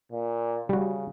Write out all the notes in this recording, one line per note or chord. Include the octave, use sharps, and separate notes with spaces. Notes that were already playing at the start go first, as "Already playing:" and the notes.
A#2
C#3 G3 F#4